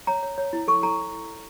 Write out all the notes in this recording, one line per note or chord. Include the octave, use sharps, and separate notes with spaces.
C#5 A#5
C#5
C#5
E4
A4 C#6
A4 A#5